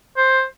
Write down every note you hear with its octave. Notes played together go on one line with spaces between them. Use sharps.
C5